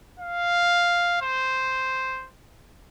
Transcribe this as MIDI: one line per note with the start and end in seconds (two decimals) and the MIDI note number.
0.19 1.18 77
1.22 2.27 72